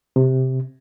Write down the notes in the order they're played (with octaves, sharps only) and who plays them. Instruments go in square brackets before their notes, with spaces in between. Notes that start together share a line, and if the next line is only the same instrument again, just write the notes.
[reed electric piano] C3